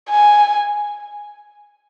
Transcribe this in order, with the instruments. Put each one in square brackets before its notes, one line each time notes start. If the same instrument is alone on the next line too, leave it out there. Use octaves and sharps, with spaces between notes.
[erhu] G#5